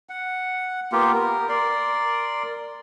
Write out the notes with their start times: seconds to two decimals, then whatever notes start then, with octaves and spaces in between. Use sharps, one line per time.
0.09 F#5
0.92 A#3 B3 F4 G4
1.13 A#4
1.49 A#4 D5 C6